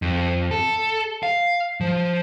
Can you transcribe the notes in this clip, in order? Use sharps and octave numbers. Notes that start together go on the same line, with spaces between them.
F2
A4
F5
F3